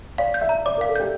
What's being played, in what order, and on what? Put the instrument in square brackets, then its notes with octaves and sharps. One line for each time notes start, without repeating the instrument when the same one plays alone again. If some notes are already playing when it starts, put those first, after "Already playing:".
[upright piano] D5 [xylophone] F5
[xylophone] G6
[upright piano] E5
[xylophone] A#5
[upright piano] D5 [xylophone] D6
[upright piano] A#4
[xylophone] F5
[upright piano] A4
[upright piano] G4 [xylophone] G6